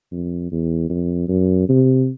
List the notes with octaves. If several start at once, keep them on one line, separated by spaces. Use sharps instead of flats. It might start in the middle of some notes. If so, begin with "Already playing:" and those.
F2
E2
F2
F#2
C3